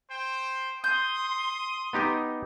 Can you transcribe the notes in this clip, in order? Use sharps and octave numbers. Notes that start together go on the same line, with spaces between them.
C5 G5
C6 D#6 G6
B3 D#4 G4